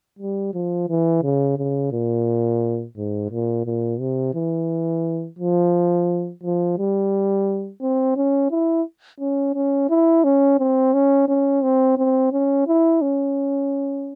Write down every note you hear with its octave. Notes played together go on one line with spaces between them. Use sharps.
G3
F3
E3
C#3
C#3
A#2
G#2
A#2
A#2
C3
E3
F3
F3
G3
C4
C#4
E4
C#4
C#4
E4
C#4
C4
C#4
C#4
C4
C4
C#4
E4
C#4